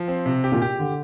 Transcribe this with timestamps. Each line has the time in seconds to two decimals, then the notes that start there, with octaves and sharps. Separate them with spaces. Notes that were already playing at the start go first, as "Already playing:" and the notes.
Already playing: F3
0.08 C4
0.26 C3
0.44 G4
0.52 A#2
0.62 G4
0.79 D3